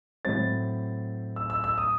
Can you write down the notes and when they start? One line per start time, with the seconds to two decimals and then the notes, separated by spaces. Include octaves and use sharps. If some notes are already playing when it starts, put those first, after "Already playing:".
0.25 A2 F#3 C4 A6
1.36 E6
1.50 E6
1.64 E6
1.78 D#6